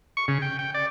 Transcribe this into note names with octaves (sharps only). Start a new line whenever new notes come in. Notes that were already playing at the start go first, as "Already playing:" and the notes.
C#6
C#3
G5
G5
D5